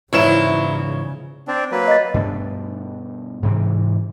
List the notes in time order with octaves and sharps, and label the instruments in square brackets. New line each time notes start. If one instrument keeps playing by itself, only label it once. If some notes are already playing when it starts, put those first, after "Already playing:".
[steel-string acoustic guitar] E2 G#2 F3 [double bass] C#3 [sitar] F#3 E4 [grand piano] C#5 E7
[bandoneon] C4 D4
F#3 A#3 B4
[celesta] D#5 A6
[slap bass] G2 B2 A3 D4
G#2 C3 E3